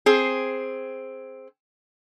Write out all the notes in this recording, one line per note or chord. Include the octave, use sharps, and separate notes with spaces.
C4 G#4